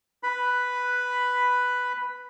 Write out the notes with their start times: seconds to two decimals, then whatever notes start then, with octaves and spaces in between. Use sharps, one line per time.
0.23 B4 B5